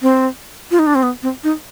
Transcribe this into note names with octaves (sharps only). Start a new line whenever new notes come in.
C4
F4
D#4
D4
C4
B3
C4
D#4